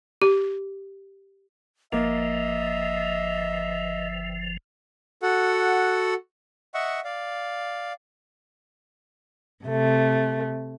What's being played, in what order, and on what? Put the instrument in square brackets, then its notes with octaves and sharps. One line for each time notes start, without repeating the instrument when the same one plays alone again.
[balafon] G4
[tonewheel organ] G1 F3 [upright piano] A#3 [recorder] D#5 [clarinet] E5
[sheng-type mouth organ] F#4 A4 F#5
D#5 E5 F#5 C#6
D5 F5
[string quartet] C3 A3